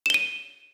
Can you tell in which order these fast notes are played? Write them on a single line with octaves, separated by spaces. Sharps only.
E7 G7 D#7